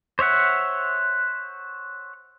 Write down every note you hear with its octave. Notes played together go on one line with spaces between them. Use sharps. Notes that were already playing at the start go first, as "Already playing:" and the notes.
C5 C#5 E5 F#5